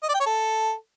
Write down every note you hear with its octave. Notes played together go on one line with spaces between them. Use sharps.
D#5
D5
G5
C#5
A4